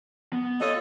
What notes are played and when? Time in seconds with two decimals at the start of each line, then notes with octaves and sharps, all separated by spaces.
0.33 B3
0.61 F#4 A4 C#5 D#5 F5